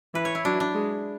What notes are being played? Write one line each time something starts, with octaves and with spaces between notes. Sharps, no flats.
E3 B4
C#5
E4
F#3 D4
D4
G#3